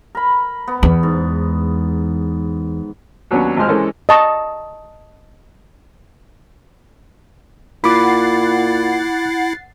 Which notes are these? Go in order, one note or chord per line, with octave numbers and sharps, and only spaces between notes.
A#4 B5
B3
E2
G#2
D#2 F#3 B3 C#4 D4 C#5
G#1 F3 G#3 G#4 C5 F6
E3 G#3 C#4 A4 A#4 C5
D#5 A5 C#6
A#2 E4 F#5 B5 D6 A6 C7